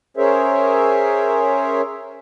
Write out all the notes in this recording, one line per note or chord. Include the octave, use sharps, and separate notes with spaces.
C#4 G#4 A#4 C5 C#5 E5